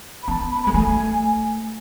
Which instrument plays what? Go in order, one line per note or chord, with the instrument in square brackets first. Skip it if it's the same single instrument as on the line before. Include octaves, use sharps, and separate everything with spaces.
[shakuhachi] B5
[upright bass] B3 [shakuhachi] A5
[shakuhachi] B5
B5
[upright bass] G#3 [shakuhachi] B5
[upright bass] A3 [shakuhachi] G#5